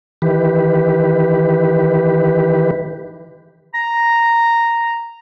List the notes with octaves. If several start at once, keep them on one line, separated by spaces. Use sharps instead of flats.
D#3 E3 G4 B4
A#5